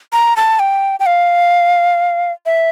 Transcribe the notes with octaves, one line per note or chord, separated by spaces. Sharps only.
A#5
A5
G5
G5
F5
E5